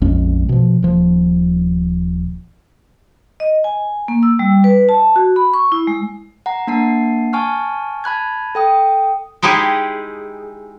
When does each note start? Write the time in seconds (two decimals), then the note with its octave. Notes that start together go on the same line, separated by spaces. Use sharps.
0.01 A#1 F2 G#3 C#4
0.49 B2 F3
0.83 D#1 F3
3.40 D#5
3.64 G#5
4.08 A#3
4.23 E6
4.39 G3
4.64 B4
4.89 A5
5.16 F#4
5.36 B5
5.54 C#6
5.72 E4
5.87 G#3
6.46 F#5 A#5
6.67 A#3 D4 F#5 A5 C7
7.33 G#5 A5 C#6 F6 F#6
8.04 A5 B5 F#6 G#6
8.55 A4 G5 D#6
9.42 G#3 D#4 E4 G4 G#4